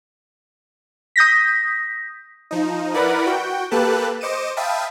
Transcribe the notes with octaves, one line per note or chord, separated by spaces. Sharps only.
D#6 G6 A#6 B6
F3 D#4
E4 A#4 B4 D5 F#5 B5
F#4 G5
A#3 G4 A4 B4 A5 F#6
C5 D#5 D6 C#7 D#7 E7
E5 F5 G5 A5 B5 D#6